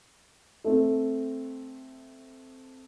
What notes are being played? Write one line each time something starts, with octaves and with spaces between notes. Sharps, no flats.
A3 C4